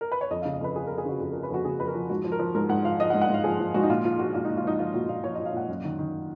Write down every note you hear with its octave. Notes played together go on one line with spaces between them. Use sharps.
A#4
B4
C#5
F2 D#5
F5
C#3
D#5
F2 B4
F3 G#4
A#4
F2
G#4
C#3 F#4
F2 G#4
A#4
F3
B4
F2 F#4
C#3 G#4
F2 B4
A#4
F3
G#2 F#4
F3
A#4
F3
G#2 A#4
G#2 F#5
F3 F5
F3 D#5
F#5
G#2
F#5
G#2 F5
F3 G#4
F3
G#2 F#4
D#4
A#2 F4
F3 F4
F3 F#4
A#2 F4
D#4
A#2
F4
F3 D#4
F3 F4
A#2 F#4
A#2 F5
F3 C#5
D#5
F3
F5
A#2 F#5
F#2
D#3
D#3